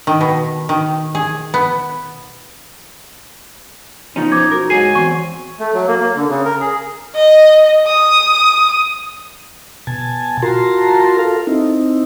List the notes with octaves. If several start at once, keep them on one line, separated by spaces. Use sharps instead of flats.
D#3
B2
D#3
G#4
B3
B2 F3 C#4 D#4
C5 D6 G#6
F#4 A#4
G#2 F#3 G#4 G#5 C7
E2 C4 C#6
A3
F#3
A#3
A#3
D3
C#3
A#4
G#4
D#5
D#6
B2 G#5 A5
F4 F#4 A#4 A5 A#5 C6
A4 F5
C4 D#4 E4